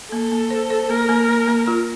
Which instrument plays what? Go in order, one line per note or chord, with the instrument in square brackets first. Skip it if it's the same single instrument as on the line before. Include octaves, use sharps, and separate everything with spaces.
[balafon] A#3 [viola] A4
[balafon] A#3
C5
C5
[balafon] A#3 [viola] A#4
[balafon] A#3
A#3
A#3
F4